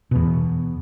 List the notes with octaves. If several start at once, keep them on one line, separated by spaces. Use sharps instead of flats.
E2 B2